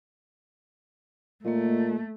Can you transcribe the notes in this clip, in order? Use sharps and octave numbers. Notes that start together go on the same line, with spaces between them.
A#2 A3 A#3 D#5